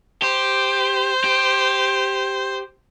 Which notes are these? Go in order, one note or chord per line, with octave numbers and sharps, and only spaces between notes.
G4 C5
G4